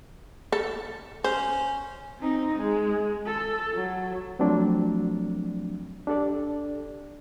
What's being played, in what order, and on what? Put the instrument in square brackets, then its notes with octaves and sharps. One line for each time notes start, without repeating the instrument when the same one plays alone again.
[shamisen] A4
[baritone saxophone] C#4 [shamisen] C5
[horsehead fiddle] C4 D#4
G#3
A4
F#3
[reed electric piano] F3 F#3 A3 C4 D4
D4 G4 A4 D5